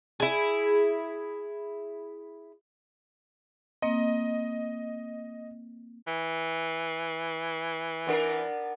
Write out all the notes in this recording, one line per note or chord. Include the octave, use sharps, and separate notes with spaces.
E4 G#4
A#3 C4 D#5
E3
B3 D4 A#4